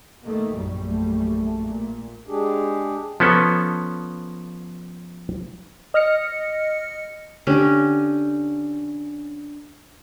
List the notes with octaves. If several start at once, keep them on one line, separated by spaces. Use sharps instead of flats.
D#3 A3 A#3
A#1 F#2 G3
A3
A#2
G#3 D4 G4 G#4
F3 B3 C#4 A4
D#5 F6 A#6 C#7
D3 C#4 G4